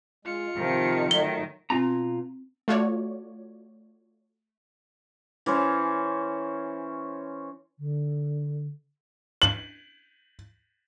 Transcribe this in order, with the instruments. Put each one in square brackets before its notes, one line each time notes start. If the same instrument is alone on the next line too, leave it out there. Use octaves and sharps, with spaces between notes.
[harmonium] G#3 [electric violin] F4 C#7
[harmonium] C3 F3 [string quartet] D#3
[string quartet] D#3 [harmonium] F#3 A3 [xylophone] G7
[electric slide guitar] B2 F4 A#5 [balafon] C4
[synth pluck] A3 F4 F#4 C#5 D5
[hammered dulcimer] E3 C#4 C5
[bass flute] D3
[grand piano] F#7